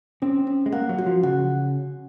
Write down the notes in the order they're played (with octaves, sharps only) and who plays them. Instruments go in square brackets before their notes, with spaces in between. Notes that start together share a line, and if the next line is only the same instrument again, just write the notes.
[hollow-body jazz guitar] C4 [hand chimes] C#4
[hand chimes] C#4
[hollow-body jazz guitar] G#3
[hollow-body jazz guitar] A#3 [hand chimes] F#5
[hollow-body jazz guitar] F#3
[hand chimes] F#4
[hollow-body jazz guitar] F3
[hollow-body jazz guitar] C#3 [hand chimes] F#5